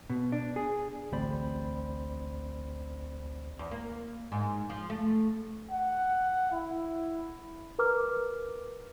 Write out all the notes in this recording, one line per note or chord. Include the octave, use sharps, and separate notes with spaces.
B2
D4
G#4
A1 D2 C4 C5 D5 B5
E2
A#3
G#2
F3
A3
F#5
E4
A#4 B4 A#5 D6 F6